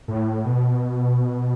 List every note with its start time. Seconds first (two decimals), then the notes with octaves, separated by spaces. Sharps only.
0.08 A2
0.45 B2